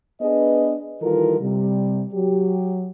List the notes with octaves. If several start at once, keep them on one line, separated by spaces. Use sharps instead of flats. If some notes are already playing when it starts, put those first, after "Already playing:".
B3 D4 G#4 B4 D#5
D#3 E3 G3 F4 A4 A#4
C3 G3
F#3 G4